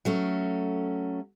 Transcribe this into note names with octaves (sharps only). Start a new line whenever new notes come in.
F#3 A3 C#4